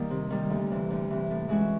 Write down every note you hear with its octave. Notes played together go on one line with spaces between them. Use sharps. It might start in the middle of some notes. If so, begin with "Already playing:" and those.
Already playing: D#3 G3 A#3
C3
D#3 G3
D2
C3 E3
D2
C3 E3
A2
E3 G#3 C#4 F#4